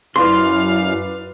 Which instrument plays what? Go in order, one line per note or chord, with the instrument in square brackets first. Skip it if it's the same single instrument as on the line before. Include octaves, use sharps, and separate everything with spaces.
[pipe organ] F#2 F5 [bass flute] E4 [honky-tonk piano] F4 B4 D5 [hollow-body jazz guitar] C6